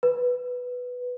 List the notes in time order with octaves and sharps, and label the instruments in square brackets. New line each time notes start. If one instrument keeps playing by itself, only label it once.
[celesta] B4